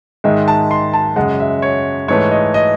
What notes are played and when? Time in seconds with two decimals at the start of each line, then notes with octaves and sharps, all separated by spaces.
0.24 G#2 D#3 G#3 E5
0.48 A5
0.71 C6
0.94 A5
1.16 F#2 C#3 G#3 F#5
1.40 E5
1.62 C#5
2.08 G#2 E3 A3 C#5
2.31 D#5
2.54 D#5